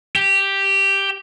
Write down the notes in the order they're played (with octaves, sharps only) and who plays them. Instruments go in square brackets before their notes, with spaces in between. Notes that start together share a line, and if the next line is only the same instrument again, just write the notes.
[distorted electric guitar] G4